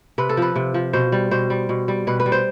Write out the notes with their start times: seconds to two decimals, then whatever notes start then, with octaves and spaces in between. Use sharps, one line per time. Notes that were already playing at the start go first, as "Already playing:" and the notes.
0.18 C3 B4
0.29 A4
0.37 F3 B4
0.56 C3
0.74 F3
0.93 B2 C5
1.12 G3
1.31 B2 C5
1.50 G3
1.69 B2
1.88 G3
2.07 B2 B4
2.20 B4
2.26 G3
2.32 C5